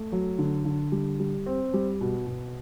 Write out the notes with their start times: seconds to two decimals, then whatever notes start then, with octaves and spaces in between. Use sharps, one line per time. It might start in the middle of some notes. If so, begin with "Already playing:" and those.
Already playing: A3
0.12 F#3
0.38 D3
0.65 D3
0.92 G3
1.19 G3
1.46 C4
1.74 G3
2.01 B2
2.27 B2